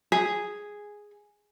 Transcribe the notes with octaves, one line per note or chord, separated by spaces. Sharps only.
G#4